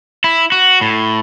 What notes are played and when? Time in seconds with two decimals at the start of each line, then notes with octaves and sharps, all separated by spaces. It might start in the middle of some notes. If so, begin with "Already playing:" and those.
0.24 E4
0.52 F#4
0.81 A2